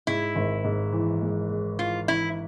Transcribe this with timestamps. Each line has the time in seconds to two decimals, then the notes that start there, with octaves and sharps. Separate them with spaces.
0.07 G#2 E4
0.36 G#1
0.64 G#2
0.93 E3
1.22 G#3
1.50 G#3
1.79 E3 F4
2.08 E3 E4